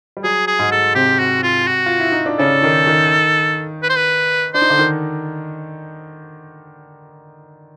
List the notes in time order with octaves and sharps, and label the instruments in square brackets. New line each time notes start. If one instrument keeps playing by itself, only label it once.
[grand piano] G3
[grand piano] F#3 [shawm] G#4
[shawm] G#4
[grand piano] G#2 G#3
[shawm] A4
[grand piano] C3 C4 [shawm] G4
[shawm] F#4
F4
F#4
[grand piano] F4
E4
D#4
D4
[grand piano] C#3 C#4 [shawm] A4
[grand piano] D#3 D#4
D#3 D#4
[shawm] B4
C5
B4
[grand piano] D4 [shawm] C5
[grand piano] D#4
D3 D4
D#3 D#4